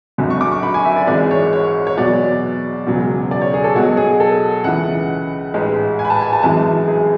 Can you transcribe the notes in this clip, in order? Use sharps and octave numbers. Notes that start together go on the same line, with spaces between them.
G#1 F#2 D3
C#6
D6
C#6
B5
G#5
E5
D5
G#1 G#2 E3 G#3 D5
C#5
C#5
C#5
E2 B2 F#3 D5
E1 E2 C#3 F#3
D5
C#5
G#4
A4
B1 B2 F#3 F#4
G#4
A4
C#2 C#3 E3 F#5
A1 G#2 G#3
G#5
B5
A5
G#5
A5
G#1 F#2 E3 G#3 A5
G#4